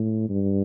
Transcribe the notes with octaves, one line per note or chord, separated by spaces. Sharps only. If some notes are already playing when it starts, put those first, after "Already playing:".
Already playing: A2
G2